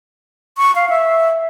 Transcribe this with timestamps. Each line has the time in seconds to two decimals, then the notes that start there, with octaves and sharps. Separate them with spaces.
0.58 C#6
0.75 F5
0.89 E5